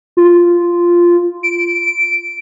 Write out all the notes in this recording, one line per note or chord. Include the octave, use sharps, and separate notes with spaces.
F4
D7